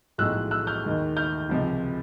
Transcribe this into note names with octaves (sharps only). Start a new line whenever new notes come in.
B1 A2 F3 G#3 E6 F#6
E6 F#6
F6 G6
D#2 D#3 G#3
F6 G6
C#2 C3 F3 G#3